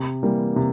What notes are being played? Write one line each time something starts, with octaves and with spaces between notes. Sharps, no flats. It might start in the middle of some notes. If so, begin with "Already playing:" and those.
Already playing: C3
E3 G3 A#3
C3